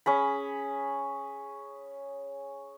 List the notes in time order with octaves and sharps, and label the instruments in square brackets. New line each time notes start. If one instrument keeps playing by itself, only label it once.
[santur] C#4 G#4 B5